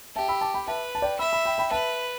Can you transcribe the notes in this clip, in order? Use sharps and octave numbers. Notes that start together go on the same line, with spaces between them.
G4 E5 A5
B5 E6
A5 D6
G5 B5
B4 E5 A5
A5
D5 G5
E5 B5 E6
B5 E6
G5 B5
G5 B5
B4 E5 A5